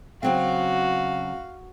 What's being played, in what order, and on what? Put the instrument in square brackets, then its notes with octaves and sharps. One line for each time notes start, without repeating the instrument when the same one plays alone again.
[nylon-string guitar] C#3 F#3 C4 [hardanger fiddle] F#4 [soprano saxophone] F5